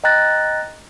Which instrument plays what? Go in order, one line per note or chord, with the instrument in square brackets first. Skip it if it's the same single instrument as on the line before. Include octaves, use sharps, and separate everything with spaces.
[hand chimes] D#5 G5 A#5 F#6 A6 A#6